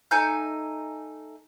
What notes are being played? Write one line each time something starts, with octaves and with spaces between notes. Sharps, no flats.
A3 D#4 G#5 G6